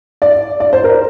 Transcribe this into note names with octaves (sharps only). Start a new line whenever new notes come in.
D5
D5
C5
A#4